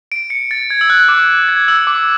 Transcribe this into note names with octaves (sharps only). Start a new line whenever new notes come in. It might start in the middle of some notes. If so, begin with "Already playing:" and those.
D7
C#7
A6
G#6
E6
F#6
D6
G#6
E6
D6